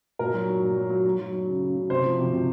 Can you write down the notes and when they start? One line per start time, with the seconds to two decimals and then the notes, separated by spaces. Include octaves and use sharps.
0.19 A#2 A#4
0.34 F#3
0.49 F#3
0.62 A#2
0.77 F#3
0.90 F#3
1.05 F#3
1.19 F#3
1.33 F#3
1.47 C#3
1.62 C#3
1.76 C#3
1.90 C3 C5
2.05 F3
2.19 C3
2.32 C3